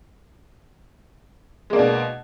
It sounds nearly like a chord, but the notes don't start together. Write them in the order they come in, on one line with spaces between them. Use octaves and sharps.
G#3 A#3 D4 B2